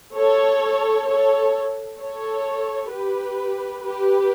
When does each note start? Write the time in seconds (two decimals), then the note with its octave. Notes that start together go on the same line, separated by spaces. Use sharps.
0.16 A4 C#5
1.07 A4 C#5
1.99 A4 C#5
2.92 G4 B4
3.83 G4 B4